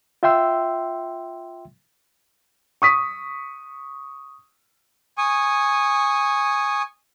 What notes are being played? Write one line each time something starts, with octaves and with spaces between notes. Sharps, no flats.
F4 E5 G5 C6 E6
C#6 D#6 B6
G#5 C#6 D#6